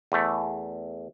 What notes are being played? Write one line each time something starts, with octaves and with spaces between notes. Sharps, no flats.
E2 A3